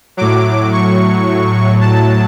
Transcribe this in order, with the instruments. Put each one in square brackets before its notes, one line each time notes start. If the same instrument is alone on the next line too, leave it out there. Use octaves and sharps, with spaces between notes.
[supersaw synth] A2 F#3 D6
C#6
A5